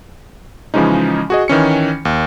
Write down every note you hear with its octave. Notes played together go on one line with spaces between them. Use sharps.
C#3 E3 F3 G#3 C#4 D#4
F#4 G#4 D#5
D#3 E3 C#4 C#7
D#2